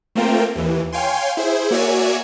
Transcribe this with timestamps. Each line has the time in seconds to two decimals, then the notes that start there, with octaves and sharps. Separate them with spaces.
0.15 A3 A#3 C4 F4 A#4 G5
0.56 D#2 E3
0.93 C#5 F5 G5 G#5 C6
1.37 E4 G#4 C5
1.71 A#3 F#4 C#5 D5 E5 G#5